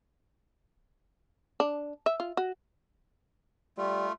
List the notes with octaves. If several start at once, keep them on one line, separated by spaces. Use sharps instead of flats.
D4
E5
F4
F#4
G3 A3 F4